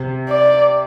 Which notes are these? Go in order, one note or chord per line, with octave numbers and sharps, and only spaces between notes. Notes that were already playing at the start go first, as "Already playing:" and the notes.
Already playing: C3
D5